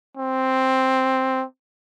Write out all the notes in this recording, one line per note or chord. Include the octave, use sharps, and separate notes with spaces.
C4